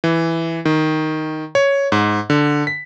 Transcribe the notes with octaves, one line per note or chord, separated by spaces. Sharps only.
E3
D#3
C#5
G#2
D3
B6